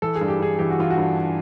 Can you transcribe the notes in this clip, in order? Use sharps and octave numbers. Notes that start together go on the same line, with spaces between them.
E3 A4
G#4
G2
G4
G2 G#4
E3 G4
F#4
E3 F4
F#4
G2